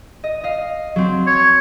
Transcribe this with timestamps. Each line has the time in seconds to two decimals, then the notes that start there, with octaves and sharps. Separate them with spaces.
0.24 D#5
0.44 D#5 F5
0.96 F#3 C4
1.27 C#5